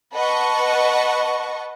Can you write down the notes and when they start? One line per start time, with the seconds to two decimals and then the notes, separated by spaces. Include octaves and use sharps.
0.14 B4 D#5 F#5 A5 C#6